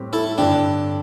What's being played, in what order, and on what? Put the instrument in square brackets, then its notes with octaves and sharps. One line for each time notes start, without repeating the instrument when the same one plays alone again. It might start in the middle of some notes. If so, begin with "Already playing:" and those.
Already playing: [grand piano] A2 G3 C4 G4
[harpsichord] E4 A4
[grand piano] G2 D3 C4 A4 [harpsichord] D4 G4